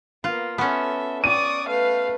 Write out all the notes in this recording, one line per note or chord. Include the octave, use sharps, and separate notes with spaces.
A#3 B3 F4
B3 C#4 A4 E5
D5 C#6 D#6 D#7
A3 B4 F5